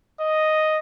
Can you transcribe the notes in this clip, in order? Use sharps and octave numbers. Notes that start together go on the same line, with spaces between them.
D#5